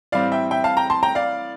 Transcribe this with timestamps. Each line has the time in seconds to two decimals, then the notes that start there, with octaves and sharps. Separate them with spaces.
0.12 A2 E3 G3 C4 D5 F5
0.32 E5 G5
0.51 E5 G5
0.64 F5 A5
0.77 G5 A#5
0.90 A5 C6
1.03 G5 A#5
1.15 D5 F5